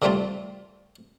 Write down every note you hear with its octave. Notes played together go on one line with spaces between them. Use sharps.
D3 E3 G3 A3 C4 F4